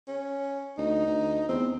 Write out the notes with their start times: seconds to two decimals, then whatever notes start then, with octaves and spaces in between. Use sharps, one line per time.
0.08 C#4
0.78 D2 D#4
1.07 D2
1.49 E2 C4